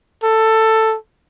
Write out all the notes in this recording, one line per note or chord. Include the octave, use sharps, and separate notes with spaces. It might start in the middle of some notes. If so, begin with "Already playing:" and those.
A4